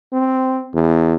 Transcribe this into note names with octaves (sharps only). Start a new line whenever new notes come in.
C4
E2